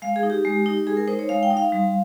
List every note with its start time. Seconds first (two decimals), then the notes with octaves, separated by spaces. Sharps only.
0.02 G#3 F5
0.16 G#4
0.23 D#4
0.30 G4
0.45 G#3
0.66 D#4
0.87 G#3 G#4
0.97 A#4
1.08 D#4 C5
1.19 C#5
1.29 G#3 F5
1.43 G5
1.51 D#4
1.57 F5
1.72 G3